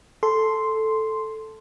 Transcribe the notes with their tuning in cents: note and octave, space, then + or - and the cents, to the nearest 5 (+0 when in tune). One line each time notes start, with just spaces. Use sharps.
A4 +0 C6 +0